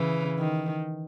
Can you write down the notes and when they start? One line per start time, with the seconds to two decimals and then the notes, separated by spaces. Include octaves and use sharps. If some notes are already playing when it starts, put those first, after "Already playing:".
Already playing: C#3 E3
0.39 D#3